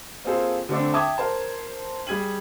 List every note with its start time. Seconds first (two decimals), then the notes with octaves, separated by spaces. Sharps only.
0.24 A#3 C4 F4 G#4 A4 C5
0.69 D3 A3 C4 D4
0.93 E5 G5 A5 D6 D#6 G#6
1.18 A#4 C5 A5
2.07 G3 G#4 G#6 D#7 F#7